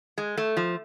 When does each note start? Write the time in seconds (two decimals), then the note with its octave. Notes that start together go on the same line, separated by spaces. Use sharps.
0.18 G#3
0.37 A3
0.57 F3